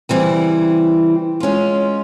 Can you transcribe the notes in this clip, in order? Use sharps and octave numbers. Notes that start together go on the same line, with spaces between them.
C#3 E3 G3 C4 E4
G#3 C#4 F4